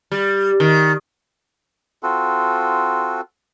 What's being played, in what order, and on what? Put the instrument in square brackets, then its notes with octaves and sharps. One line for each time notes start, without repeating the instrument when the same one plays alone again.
[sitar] G3
D#3
[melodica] C4 F4 F#4 A4